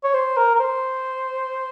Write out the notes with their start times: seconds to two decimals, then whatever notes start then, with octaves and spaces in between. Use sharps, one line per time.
0.04 C#5
0.14 C5
0.37 A#4
0.55 A#4
0.59 C5